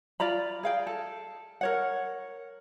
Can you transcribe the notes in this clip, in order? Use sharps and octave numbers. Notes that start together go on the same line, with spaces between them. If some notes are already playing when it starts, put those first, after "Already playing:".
F4 D5 A#5 B5
G#4 F5 G5
A4
A#4 C#5 F#5